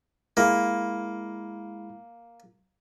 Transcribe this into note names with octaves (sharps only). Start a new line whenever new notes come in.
G#3 A#3 E4 B5